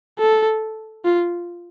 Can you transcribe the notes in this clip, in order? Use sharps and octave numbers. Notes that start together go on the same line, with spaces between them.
A4
F4